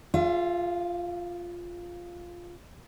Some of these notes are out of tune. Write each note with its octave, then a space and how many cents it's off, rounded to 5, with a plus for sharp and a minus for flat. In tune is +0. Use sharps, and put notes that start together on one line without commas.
F4 +0 G#4 +0 E5 +45